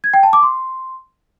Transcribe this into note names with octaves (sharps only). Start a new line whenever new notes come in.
G#6
G5
A5
D6
C6